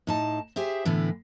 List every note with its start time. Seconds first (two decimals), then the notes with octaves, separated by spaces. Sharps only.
0.07 A2 D#4 A5
0.56 G4 G#4 C5 E5
0.85 A2 D3 E3 B3